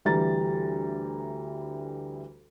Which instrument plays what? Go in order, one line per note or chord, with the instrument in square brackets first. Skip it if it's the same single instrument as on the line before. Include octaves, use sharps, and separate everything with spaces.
[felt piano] D2 E3 G3 G4 A#5 A6